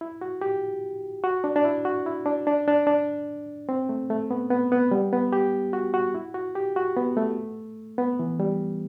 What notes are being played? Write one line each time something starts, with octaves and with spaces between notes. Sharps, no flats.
E4
F#4
G4
F#4
D4
D4
E4
F#4
E4
D4
D4
D4
D4
C4
A3
A3
B3
B3
B3
G3
B3
G4
F#4
F#4
E4
F#4
G4
F#4
B3
A3
B3
E3
G3